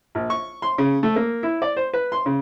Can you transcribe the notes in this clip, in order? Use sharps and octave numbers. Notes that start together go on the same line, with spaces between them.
A#1
C#6
C6
C#3
A3
A#3
E4
D5
C5
B4
C6
C#3